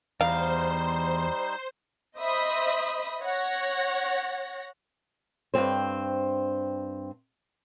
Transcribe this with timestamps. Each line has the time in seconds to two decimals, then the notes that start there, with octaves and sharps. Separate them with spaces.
0.21 E2 G3 D#4 C5 F5
2.18 C5 D#5 E5 B5 D#6
3.23 C#5 F#5 A#6
5.54 G2 A#2 C4 C5